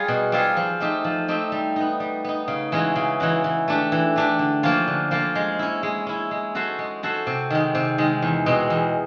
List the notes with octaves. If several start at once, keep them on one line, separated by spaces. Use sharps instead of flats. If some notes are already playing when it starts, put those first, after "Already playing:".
Already playing: G3 F4 G#4
B2
G3 C4 F4 G#4
F3
A3 C4 D#4 G4
F3
A3 C4 D#4 G4
G3
B3 D#4
G3
B3 D#4
C#3
E3 G#3 C#4 F#4
C#3
E3 G#3 C#4 F#4
E3
A3 D4 G4
E3
A3 D4 G4
D3
F3 A#3 C#4 F4
D3
F3 A#3 C#4 F4
G#3
C#4 E4
G#3
C#4 E4
G#3
C#4 F#4 A4 C5
G#3
C#4 F#4 A4 C5
C3
D#3 G#3
C3
D#3 G#3
E2
B2 G#3 C4
E2